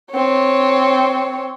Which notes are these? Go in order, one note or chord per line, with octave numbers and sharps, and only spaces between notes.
C4 C#5